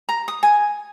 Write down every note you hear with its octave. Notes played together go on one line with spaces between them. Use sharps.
A#5
D#6
G#5